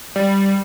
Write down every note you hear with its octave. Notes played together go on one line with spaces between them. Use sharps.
G3